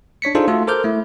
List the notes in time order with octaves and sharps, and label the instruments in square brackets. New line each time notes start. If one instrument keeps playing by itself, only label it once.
[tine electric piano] D4 C#5 B6 C#7
D4 D#4 F4 G#4 A4 C5
A3 F4 F#4 A4
A4 A#4 C5 D6 F6 G6
A3 E4